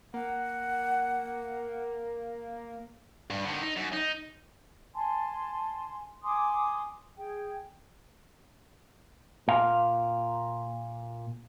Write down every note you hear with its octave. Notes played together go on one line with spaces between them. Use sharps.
A#3 F#5
G2
D3 D#3
D#4
F#2
D#4
G#5 A5 C6
G#5 C6 D6 D#6
G#4 G5
A#2 F5